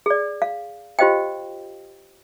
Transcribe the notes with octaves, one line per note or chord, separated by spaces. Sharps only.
G#4 D5
F5
F4 G4 C5 D#5 F5 G5